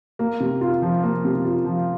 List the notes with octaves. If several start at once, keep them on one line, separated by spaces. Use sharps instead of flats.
A#3
C3
F4
F3
A#3
C3
F4
F3